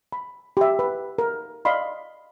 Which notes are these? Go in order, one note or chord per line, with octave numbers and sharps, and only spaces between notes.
B5
G4 E5
B4
A#4
D5 D#5 F5 B5 C6